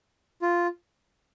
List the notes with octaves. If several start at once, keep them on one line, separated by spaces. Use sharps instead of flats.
F4